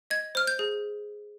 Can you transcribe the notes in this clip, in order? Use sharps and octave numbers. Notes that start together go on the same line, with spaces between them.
D#5 G#6
C5 F6
G6
G#4